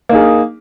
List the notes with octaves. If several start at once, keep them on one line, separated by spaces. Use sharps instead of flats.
A#3 D#4 G#4